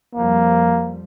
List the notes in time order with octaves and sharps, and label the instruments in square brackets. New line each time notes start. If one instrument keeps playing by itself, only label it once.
[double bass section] F2 F3 G3 [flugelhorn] A#3